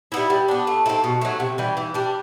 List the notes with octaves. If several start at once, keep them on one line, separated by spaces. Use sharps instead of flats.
G3 B3 E4
G3
B3 D4
A3
C4 E4 A4
B2
F#3 A3
C3
E3 G3
E3
G3 D4